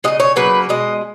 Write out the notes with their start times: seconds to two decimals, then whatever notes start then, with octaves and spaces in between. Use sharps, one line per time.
0.04 C#3 G#3 D#5
0.20 C#5
0.36 C#3 F#3 A#3 B4
0.69 B2 G#3 D#5